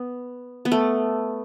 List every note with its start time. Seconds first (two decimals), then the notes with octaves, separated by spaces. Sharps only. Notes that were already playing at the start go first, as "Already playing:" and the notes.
Already playing: B3
0.65 B3
0.72 A3